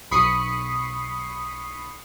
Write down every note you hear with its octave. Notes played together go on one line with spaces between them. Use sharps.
B1 B5 C#6 D#6 C7 C#7